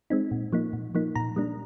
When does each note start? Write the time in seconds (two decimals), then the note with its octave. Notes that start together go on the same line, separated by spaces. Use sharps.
0.10 G#3 C4 D#4
0.31 A#2
0.53 F3 A#3 D#4
0.73 A#2
0.95 F3 A#3 D#4
1.15 A#2 A#5
1.36 G3 A#3 D4